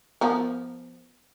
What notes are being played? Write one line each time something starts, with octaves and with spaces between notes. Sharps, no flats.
F3 B3 A#4